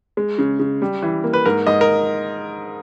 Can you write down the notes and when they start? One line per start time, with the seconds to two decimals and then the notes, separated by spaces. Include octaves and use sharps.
0.17 G#3
0.38 C#3
0.59 C#3
0.82 G3
1.02 E3
1.24 A#3
1.33 B4
1.45 G#2 A#4
1.67 G#2 D#5
1.81 A#4